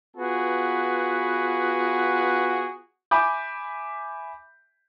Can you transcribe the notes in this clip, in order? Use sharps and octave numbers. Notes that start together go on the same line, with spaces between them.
B3 F4 F#4 G#4 B4
E5 G#5 B5 D6 G6